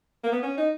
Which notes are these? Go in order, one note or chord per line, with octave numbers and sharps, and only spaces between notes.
A#3
B3
C#4
D#4